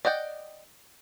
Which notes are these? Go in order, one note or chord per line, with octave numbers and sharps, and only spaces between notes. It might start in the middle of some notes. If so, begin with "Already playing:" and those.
D5 D#5 F#5 G5